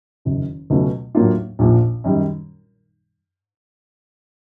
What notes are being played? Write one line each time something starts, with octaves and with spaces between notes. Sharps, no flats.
F#1 F#2 D#3
C#2 B2 F#3 A3 C#4
A2 F#3 A#3 D4 F4
A#1 A#2 F3
F#2 D#3 G3